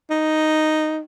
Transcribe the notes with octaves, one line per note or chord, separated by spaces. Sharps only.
D#4